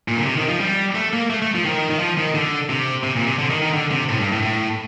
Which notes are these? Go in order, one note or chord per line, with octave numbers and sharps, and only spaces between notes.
A#2
D3
C3
D#3
F3
G3
A3
A#3
A3
A3
F3
D#3
D#3
F3
D#3
D3
C3
C3
A#2
C3
D3
D#3
D#3
D3
C3
A2
G2
A2
A2